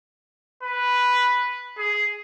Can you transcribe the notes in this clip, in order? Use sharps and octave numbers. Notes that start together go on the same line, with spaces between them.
B4
G#4